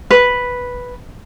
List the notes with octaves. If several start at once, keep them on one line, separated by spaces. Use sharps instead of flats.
B4